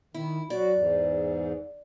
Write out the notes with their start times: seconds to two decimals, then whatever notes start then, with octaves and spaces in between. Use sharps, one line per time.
0.14 D#3 E4
0.50 F#3 F#4 D5
0.75 E2 G#2